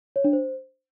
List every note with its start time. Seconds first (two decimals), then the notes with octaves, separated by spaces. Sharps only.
0.16 C#5
0.24 D4
0.33 C5